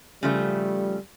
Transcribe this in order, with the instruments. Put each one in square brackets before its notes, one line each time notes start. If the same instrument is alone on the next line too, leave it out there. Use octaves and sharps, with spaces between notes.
[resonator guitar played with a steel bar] C#3 F3 A3 [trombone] G3